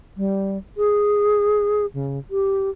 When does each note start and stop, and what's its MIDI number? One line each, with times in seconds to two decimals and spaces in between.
0.17 0.58 55
0.77 1.86 68
1.94 2.19 49
2.31 2.70 67